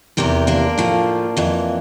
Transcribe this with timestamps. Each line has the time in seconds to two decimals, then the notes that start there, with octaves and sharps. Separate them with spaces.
0.17 E2 C3 E3 G4 A#4
0.47 A#3 D4
0.78 A2 F3
1.37 F2 E3